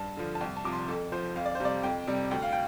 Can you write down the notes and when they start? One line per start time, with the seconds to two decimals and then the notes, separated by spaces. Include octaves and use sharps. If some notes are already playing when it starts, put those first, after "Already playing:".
Already playing: G2 A5
0.17 D3 F3
0.35 A5
0.40 C2 G5
0.57 A5
0.64 C3 F3 D6
0.72 C6
0.88 F2 A4
1.12 F3 C5
1.36 F2 F5
1.45 D5
1.55 C5
1.60 C3 G3 D5
1.83 F2 G5
2.08 C3 G3
2.31 D2 G5
2.42 F5
2.53 G5